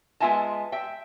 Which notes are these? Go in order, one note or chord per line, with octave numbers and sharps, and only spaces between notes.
G#3 B3 F4 E5 G#5 A5
E5 G5